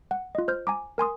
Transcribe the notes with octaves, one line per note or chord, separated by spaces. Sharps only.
F#5
F4 D#5
C5 F6 G6
G#5 A#5 D6
A#4 G#5 C6 D#6